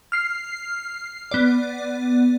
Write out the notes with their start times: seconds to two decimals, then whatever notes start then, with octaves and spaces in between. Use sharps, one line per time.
0.12 F6 C7
1.31 B3 D5